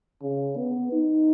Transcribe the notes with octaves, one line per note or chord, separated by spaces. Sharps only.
C#3
B3
D#4